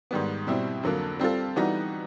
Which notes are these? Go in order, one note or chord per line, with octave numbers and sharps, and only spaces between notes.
G#2 D#3 G3 B3
B2 G3 C4 E4
F2 D3 F#3 A#3
G3 C4 F4 A4
E3 G3 B3 D#4 F#4